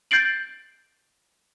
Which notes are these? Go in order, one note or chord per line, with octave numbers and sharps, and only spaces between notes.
G6 A6 C7 D7 F#7